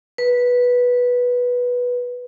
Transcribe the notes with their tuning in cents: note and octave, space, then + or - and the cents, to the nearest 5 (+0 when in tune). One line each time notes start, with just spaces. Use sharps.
B4 -10